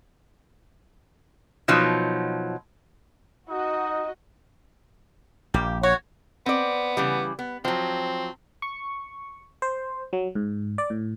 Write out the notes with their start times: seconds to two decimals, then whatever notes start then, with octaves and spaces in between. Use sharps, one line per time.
1.68 B2 F3 F#3 D#4
3.49 D#4 F#4 D#5
5.54 A#1 G3 A#3 G4
5.83 F#4 C#5
6.46 B3 C4 D5
6.97 C#3 E3 G3
7.39 B3
7.65 F3 F#3 C4
8.62 C#6
9.62 C5
10.13 F#3
10.35 G#2
10.78 D5
10.90 A2